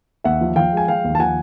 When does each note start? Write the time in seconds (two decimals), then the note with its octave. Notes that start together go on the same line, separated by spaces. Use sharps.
0.24 D#2 E5 F#5
0.41 F3
0.56 F3 F5 G5
0.72 G#3 G#5
0.88 F3 F5 G5
1.04 D#2
1.15 A5
1.19 F3 F#5 G#5